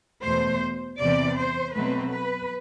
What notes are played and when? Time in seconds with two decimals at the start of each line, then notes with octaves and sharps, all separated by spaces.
0.24 E2 B2 A3 C5
0.99 E2 C3 E3 D5
1.37 C5
1.74 B2 F#3 A3 C4 B4
2.11 B4